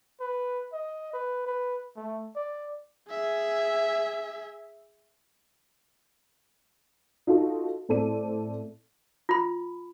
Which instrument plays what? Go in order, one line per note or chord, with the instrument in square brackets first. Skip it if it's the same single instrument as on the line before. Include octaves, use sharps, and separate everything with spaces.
[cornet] B4
D#5
B4
B4
A3
D5
[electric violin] G#4 E5
[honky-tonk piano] D#4 F4 F#4 A4
A2 C4 A4 D5 D#7
[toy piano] F4 B5